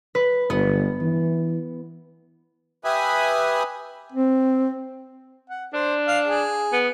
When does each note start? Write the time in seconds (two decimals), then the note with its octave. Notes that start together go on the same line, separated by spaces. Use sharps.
0.15 B4
0.50 G1 B3
1.01 E3
2.85 G4 B4 E5 G#5 B5 D#6
4.12 C4
5.49 F#5
5.73 D4 C5
6.08 F5
6.26 G#4
6.73 B3